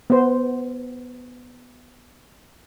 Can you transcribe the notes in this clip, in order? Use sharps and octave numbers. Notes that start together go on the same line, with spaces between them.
B3 C5